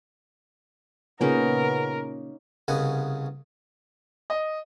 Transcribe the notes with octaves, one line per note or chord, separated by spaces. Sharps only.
A#2 C#3 A#3 B3 C#4 D#4 A#4
C2 C#3 B3 D#5 F#5 G#5
D#5